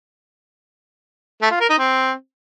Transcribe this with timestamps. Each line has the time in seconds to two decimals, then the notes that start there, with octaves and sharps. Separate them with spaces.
1.42 A3
1.51 F4
1.60 A#4
1.69 D#4
1.79 C4